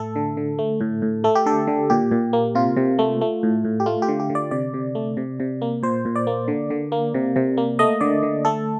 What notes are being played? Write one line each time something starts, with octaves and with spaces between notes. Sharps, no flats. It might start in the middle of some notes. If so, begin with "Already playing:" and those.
Already playing: A2 A3 A4
D3
D3
A3
A2
A2
A3 A4
G4
D3 A4
D3
A#2 G4
A#2
A#3
C3 F4
C3
A3
A3
A2
A2
G4
A3 F4
G4
D3
G4
D3
D5
C3 D5
C3
A3
C3
C3
A#3
A#2 C5
A#2
D5
A#3
D3
D3
A#3
C3
C3
A#3
A3 D#5
D3 D5
D3
A3 A4